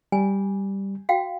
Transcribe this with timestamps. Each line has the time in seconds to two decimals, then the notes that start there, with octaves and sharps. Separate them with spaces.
0.12 G3 G#5
1.09 F#4 F5 G5